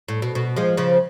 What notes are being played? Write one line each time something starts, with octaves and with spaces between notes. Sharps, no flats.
A2
B2
B2
F3 G#3
C#3 F3